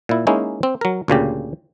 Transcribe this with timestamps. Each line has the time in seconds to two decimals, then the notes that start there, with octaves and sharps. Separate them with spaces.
0.09 A#2 E4
0.27 G#3 A#3 C#4 D#4 E4
0.63 C4
0.81 F#3 A#4
1.08 D2 A#2 C#3 G4